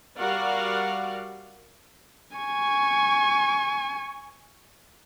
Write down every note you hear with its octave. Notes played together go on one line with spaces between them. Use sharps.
G3 F#4 A#4 D5 F5 F#5
G#5 C#6